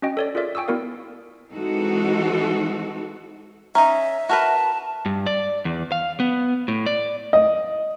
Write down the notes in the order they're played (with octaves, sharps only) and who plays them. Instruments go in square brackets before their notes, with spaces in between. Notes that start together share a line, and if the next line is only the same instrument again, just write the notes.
[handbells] C#4 F#4 D#5 G5
A4 C#5 D5
F4 G#4 A#4 D5 E5
G5 G#5 C#6 D#6 E6
B3 E4 F#4 A#4 D5 F5
[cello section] E3 G#3 C4 D#4 F#4 A4
[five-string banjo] C#4 D#4 [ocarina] E5 [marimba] A#5
[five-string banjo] F#4 A#4 B4 [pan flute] A5
[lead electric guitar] G2
D5
E2
F5
B3
A2
D5
[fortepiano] D#5